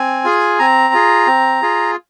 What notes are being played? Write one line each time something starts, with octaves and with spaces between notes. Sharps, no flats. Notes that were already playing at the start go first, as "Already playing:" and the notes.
Already playing: C4 G#5
F4 G#4
C4 A#5
F4 G#4
C4
F4 G#4